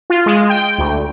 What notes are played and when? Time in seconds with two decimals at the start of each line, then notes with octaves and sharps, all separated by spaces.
0.10 F4
0.26 G#3
0.49 G5
0.78 D2